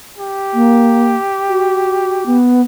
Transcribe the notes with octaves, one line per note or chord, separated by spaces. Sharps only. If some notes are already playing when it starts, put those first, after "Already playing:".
G4
A#3
F#4
B3